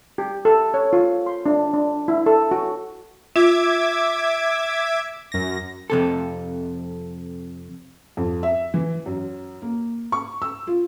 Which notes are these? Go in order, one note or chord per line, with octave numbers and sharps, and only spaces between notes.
G4
A4
C#5
F4
C6
D4
D4
E4
A4
F#4
F4 E5 D6 G#6
F#2 A#6
F2 C3 A4
F2
E5
E3
F#2
A#3
C#6
E6
F4